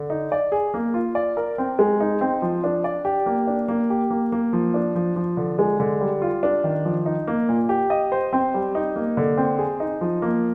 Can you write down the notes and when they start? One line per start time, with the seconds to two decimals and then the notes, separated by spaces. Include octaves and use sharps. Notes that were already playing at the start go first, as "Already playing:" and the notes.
Already playing: D3
0.10 D#4
0.32 D5
0.52 G#4
0.74 A#3
0.94 F4
1.15 D5
1.37 A#4
1.58 C4
1.79 G#3
2.00 D#4
2.21 C4
2.42 F3
2.64 D4
2.84 D5
3.05 G4
3.26 A#3
3.47 D4
3.68 A#3
3.90 G4
4.10 A#3
4.32 A#3
4.53 F3
4.74 D4
4.95 F3
5.16 F3
5.37 D3
5.59 G#3
5.80 D3
6.01 G3
6.22 F4
6.43 D4
6.64 D#3
6.85 F3
7.06 D#4
7.27 A#3
7.49 A#2
7.69 G4
7.90 D#5
8.12 C5
8.33 C4
8.54 G3
8.75 D#4
8.96 A#3
9.17 D3
9.37 C4
9.59 G#4
9.80 D#4
10.01 F3
10.22 A#3